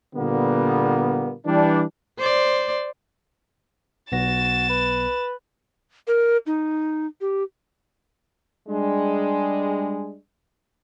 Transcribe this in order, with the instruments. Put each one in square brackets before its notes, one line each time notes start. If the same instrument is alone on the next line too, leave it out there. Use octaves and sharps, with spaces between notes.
[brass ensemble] A#2 D3 G3 A#3 B3
E3 G3 D4
[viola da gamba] C5 D5
[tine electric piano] B1 B3 A#6 [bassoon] F#4 [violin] A6 E7
[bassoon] B4
[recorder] A#4
D#4
G4
[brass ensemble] G3 G#3 D4